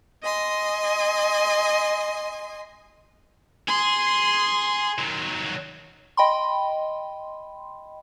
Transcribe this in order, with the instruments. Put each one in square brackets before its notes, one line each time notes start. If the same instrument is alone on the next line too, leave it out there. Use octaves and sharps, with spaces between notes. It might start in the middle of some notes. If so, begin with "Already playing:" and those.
[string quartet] D#5 G#5 C6
[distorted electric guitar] G#4 [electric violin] C6
[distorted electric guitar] D#3 F#3
[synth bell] D#5 G5 B5 C6